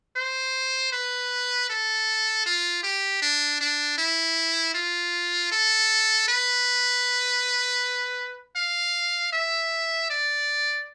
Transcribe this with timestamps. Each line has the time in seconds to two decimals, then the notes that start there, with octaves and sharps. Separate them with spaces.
0.17 C5
0.92 B4
1.70 A4
2.46 F4
2.83 G4
3.22 D4
3.61 D4
3.98 E4
4.74 F4
5.52 A4
6.28 B4
8.56 F5
9.33 E5
10.10 D5